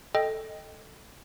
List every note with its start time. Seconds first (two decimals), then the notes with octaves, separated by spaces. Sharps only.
0.15 A4 D#5 G5